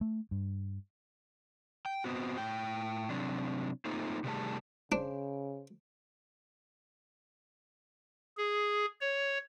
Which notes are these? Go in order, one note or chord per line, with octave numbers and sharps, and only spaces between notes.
A3
G2
G5
B3 C4 F#4
A2 G5
C3 F#3 C4 D4
A3 A#3 C4 D#4 F4
C3 D#3 G3 A3 G#4 A5
C#3 D4 C5
G#4
C#5